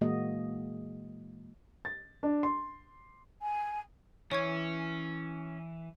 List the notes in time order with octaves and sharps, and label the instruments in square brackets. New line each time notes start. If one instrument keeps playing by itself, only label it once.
[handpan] A#2 E3 G#3 A#3 F#4 D#5
[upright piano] A6
D4
C6
[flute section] G#5
[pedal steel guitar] E3 [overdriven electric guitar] C#4 [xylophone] C#5 C#6 G#6